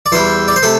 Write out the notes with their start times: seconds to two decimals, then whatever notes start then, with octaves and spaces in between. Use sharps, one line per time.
0.06 D5
0.12 E2 E3 G3 C5
0.48 D5
0.56 C5
0.63 C3 A3 A4